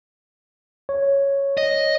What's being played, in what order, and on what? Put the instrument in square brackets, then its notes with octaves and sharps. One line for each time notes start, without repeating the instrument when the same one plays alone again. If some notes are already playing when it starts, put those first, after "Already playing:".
[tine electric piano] C#5
[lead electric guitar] D#5